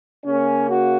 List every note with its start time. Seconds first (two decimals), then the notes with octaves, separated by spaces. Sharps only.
0.25 C#3 A#3 C#4
0.68 F#4